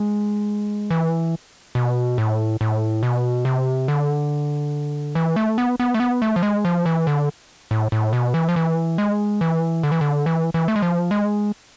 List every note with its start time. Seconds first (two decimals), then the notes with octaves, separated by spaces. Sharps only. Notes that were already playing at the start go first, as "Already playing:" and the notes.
Already playing: G#3
0.91 E3
1.75 B2
2.18 A2
2.61 A2
3.03 B2
3.45 C3
3.88 D3
5.15 E3
5.36 A3
5.58 B3
5.80 B3
5.94 A3
6.00 B3
6.22 A3
6.36 F3
6.43 G#3
6.65 F3
6.86 E3
7.07 D3
7.71 A2
7.92 A2
8.13 B2
8.34 E3
8.49 F3
8.56 E3
8.98 G#3
9.41 E3
9.83 D3
9.92 E3
10.01 D3
10.26 E3
10.54 E3
10.68 A3
10.76 G#3
10.82 F3
11.11 G#3